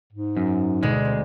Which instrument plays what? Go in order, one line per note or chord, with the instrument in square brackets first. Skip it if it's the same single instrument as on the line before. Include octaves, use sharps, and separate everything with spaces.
[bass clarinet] G#2
[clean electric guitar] F#2
[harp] D2 B2 [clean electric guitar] G#3
[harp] C4